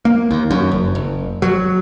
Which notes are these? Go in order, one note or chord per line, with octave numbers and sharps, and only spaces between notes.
A#3
D#2
F#2
F#1
F#1
F#3